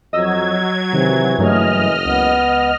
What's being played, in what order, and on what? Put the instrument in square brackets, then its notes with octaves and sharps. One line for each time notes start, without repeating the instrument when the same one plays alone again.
[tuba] F2 [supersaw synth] F#3 G#6 [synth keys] D#5 E6
[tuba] C3 [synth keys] D#3 [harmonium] E3
[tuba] F#1 [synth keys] G2 F#3 A3 [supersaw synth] D#5 F6
[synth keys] C#2 [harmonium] B3